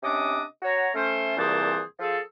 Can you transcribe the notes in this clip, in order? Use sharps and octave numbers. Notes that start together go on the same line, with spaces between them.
C3 C#4 D4 D#5 D6 D#6
F#4 C#5 A#5
A3 C#4 C5
C2 A#2 E3 G#4 C5 A5
F3 F4 G#4 A4